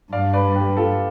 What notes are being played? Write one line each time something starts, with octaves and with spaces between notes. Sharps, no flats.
G2 D5 F5
B4 D5
G4 B4
F4 A4